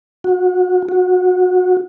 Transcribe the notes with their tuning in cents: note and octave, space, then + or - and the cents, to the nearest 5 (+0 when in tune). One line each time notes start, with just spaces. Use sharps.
F#4 -30
F#4 -25